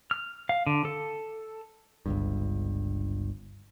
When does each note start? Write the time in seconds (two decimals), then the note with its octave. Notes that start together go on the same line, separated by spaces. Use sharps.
0.11 F6
0.49 F5
0.67 D3
0.85 A4
2.06 G1 C#2 G2